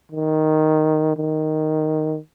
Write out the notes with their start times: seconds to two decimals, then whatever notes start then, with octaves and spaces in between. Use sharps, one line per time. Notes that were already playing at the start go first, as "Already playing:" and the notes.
0.12 D#3
1.17 D#3